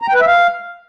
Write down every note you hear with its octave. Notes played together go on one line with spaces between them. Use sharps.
A#5
G5
B4
E5
F5